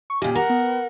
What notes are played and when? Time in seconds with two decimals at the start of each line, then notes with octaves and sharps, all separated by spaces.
0.10 C#6
0.22 A#2 C#3 G4
0.35 A#4 F#5
0.50 B3